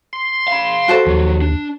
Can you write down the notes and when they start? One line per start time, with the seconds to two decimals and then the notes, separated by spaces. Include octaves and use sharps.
0.13 C6
0.48 F5 B5
0.88 F#4 A4 C5
1.07 D#2 F3 F#3
1.42 D4